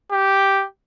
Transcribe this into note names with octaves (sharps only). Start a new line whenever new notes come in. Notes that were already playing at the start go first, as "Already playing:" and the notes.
G4